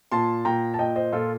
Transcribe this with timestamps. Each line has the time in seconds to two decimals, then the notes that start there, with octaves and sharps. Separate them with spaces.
0.12 A#2 A5 C6
0.45 A#2 G5 A#5
0.74 A5
0.79 A#2 D#5 G5
0.96 C5 D#5
1.13 A#2 F4 A4